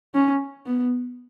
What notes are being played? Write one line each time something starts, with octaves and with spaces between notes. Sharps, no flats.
C#4
B3